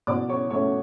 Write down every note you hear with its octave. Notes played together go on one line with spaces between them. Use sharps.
B2 D5 D6
C#5 C#6
A3 C#4 C#5 C#6